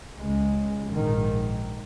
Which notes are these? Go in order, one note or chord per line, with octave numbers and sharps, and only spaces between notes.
C#2 C#3 G#3
A#1 G#2 D#3